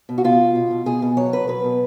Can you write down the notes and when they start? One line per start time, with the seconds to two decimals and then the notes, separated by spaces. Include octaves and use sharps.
0.09 B2
0.18 F#4
0.24 B2 F4
0.40 B2
0.55 B2
0.71 B2
0.86 B2 G#4
1.02 B2
1.17 F#3 C#5
1.32 B2 B4
1.48 F#3 B4
1.64 B2